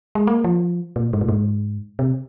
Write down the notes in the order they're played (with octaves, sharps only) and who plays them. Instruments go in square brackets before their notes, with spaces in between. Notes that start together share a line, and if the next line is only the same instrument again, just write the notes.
[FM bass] G#3
A#3
F3
A#2
G#2
A#2
G#2
C3